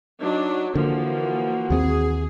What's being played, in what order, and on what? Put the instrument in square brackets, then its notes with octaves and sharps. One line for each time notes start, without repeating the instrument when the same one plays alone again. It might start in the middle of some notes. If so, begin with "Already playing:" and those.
[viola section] F#3 D4 [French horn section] D#4
[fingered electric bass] D3 [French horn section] E3 F#4 [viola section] F3 A#3
[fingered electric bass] D#2 A#3 C4 [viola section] G#4